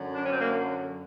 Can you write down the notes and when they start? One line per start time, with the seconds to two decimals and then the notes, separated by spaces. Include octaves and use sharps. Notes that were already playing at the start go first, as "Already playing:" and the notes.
Already playing: F#2 D3 F#3
0.15 D4
0.24 C#4
0.32 C4
0.40 A#3